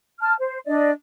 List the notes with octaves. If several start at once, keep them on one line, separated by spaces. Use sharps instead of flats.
A5 F6
C5
D4 D5 D#5